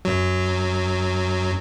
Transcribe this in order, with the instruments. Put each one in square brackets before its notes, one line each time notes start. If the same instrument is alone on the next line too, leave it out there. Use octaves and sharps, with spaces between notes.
[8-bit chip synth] F#2 F#3